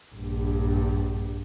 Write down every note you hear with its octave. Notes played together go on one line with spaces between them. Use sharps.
A#1 G2